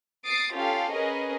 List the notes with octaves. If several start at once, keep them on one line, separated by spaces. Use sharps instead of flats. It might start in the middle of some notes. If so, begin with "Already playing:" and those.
D#6 A6 C7 D7
C#4 F4 G4 A4 F5
C#4 G#4 A#4 B4 D#5